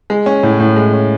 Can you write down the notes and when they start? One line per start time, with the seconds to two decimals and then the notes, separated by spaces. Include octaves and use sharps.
0.10 G#3
0.26 C#4
0.43 A2
0.60 A2
0.76 G#3
0.93 C#4